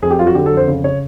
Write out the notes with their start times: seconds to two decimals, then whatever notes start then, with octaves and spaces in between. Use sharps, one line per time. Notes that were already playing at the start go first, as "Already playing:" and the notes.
0.02 F2 G#4
0.11 G4
0.19 F#3 F4
0.27 F#4
0.35 D3 G4
0.46 A4
0.52 F2
0.57 C5
0.68 C#3
0.84 C#3 C#5